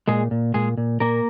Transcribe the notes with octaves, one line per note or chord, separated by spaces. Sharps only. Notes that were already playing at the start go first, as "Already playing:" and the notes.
A#2 G#3 G#4
A#2
A#2 G#3 G#4
A#2
A#2 A#3 A#4